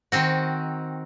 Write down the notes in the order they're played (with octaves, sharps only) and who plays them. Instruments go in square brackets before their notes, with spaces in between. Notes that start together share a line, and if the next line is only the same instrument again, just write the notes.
[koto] D#3 C4 F#4